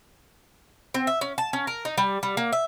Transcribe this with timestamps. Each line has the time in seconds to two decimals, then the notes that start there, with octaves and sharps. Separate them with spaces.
0.94 C4
1.07 E5
1.21 C#4
1.38 A5
1.53 C#4
1.67 A#4
1.85 D#4
1.97 G3
2.23 G3
2.37 A#3
2.52 E5